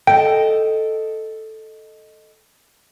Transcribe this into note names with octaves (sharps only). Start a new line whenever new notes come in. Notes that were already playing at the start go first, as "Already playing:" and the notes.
A4 D#5 G5